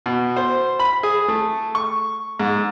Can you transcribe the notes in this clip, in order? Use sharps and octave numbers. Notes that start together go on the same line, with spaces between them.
B2
C5
B5
G#4
A3
C#6
G#2